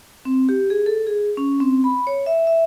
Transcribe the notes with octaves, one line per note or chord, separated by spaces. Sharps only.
C4
G4
G#4
A4
G#4
C#4
C4
B5
C#5
E5
E5